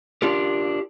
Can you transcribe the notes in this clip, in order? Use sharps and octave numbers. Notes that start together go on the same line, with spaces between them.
D4 F4 G4 A#4